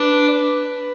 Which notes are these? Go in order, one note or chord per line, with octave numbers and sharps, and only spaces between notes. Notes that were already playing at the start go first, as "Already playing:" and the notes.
Already playing: D4 B4